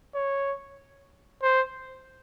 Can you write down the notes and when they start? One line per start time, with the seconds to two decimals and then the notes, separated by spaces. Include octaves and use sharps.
0.15 C#5
1.43 C5